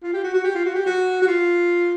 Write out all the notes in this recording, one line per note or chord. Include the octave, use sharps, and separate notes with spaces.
F4
G4
F#4
F#4
G4
F4
F#4
G4
F#4
F#4
F4